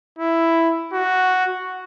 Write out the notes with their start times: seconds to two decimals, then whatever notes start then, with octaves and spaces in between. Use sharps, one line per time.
0.19 E4
0.93 F#4